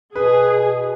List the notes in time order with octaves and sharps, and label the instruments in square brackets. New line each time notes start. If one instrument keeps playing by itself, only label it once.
[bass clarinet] B2 [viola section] G#4 [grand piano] B4